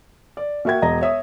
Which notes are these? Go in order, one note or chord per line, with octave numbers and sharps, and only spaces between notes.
D5
A#3 F#4 E5 G5 G#6
E1 D#5 A#5 A#6
C#5 E5 D#6